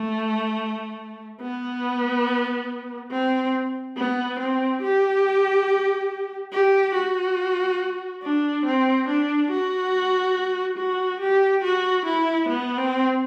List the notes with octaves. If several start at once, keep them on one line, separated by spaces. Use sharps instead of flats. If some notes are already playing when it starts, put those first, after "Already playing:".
Already playing: A3
B3
C4
B3
C4
G4
G4
F#4
D4
C4
D4
F#4
F#4
G4
F#4
E4
B3
C4